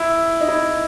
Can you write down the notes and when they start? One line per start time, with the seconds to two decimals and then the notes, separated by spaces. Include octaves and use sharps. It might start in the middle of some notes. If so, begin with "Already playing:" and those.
Already playing: E4
0.40 D#4
0.48 E4